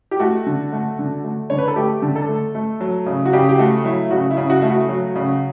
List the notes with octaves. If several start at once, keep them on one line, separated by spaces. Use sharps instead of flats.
G4
A3 F#4
D3
A3
D3
A3
D3 C#5
B4
A4
A3 G4
D3
A4
A3
A3
F#3
C#3
F#4
C#3 G4
G4
A3 F#4
F#3 E4
C#3 F#4
E4
C#3
F#4
A3 E4
F#4
F#3
C#3